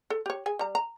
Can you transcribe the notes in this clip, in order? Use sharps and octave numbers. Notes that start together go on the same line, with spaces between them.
A4
G4 C#5
G#4 G#5
G3 A#5
A#5